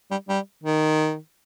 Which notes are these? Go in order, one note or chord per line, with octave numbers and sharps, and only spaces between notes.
G3
G3
D#3